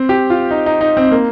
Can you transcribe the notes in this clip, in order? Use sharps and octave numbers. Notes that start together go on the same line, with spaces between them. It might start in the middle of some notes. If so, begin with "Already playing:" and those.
Already playing: C4
G4
F4
D#4
D#4
D#4
C4
A#3